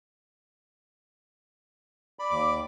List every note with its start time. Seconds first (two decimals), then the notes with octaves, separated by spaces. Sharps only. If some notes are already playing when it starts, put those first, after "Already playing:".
2.19 D5 B5
2.31 D#2 D6